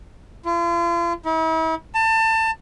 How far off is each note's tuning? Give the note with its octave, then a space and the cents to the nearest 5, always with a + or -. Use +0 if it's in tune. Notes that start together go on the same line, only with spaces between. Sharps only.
F4 -40
E4 -40
A5 +25